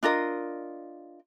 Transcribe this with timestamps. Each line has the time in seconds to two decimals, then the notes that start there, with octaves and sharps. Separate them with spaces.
0.03 D4 F4 A#4 D#5